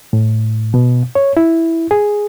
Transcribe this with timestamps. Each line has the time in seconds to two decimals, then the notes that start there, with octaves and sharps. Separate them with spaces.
0.13 A2
0.74 B2
1.15 C#5
1.37 E4
1.91 G#4